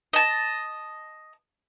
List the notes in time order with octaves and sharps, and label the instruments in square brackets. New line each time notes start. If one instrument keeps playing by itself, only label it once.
[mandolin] D#5 A5